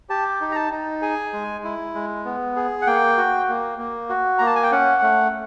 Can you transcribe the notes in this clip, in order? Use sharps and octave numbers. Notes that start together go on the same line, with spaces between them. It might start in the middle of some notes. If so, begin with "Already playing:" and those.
G4 A5
D#4
A#5
A5
D#4
G#4 G#5
G#3
E4
G#3
B3
G#4
F#5
A#3 G5
F#4
A#3
A#3
F#4
A#3 A#5
A5
G#5
G5
C#4 F#5
A3